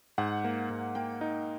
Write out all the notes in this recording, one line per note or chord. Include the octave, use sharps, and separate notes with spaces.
G#2 F#5
A#3
G#2
A#3 G5
D#4